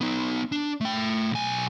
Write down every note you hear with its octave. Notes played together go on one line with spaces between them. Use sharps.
B3 D#4
D4
A3 G5
B1 G#5